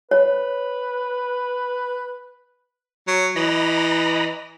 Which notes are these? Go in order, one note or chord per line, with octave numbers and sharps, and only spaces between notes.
B4 C#5
F#3
E3 D#5 A#5 B5